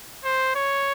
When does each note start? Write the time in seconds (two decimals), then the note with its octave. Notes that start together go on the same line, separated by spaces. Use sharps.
0.24 C5
0.55 C#5